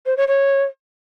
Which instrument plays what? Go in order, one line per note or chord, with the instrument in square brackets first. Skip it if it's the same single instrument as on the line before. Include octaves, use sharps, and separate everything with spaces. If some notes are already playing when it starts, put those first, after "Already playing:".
[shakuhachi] C5
C#5
C#5